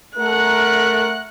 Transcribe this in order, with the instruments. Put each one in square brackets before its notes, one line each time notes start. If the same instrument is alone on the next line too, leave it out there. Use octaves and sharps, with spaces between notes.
[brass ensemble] A3 A#4 [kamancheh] F#5 F#6